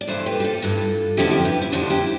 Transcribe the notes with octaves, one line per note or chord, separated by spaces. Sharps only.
D5
G2 E3 A4 C5
G4 B4
G4
F4 A4
G2 E3
F2 D3 F3 E4 G4
E4 G4
G4 B4
E4
F2 D3 F3 D4 F4
E4 G4